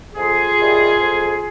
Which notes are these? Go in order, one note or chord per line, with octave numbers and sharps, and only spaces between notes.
F2 F4 G#4
C3 D#3 G3
F2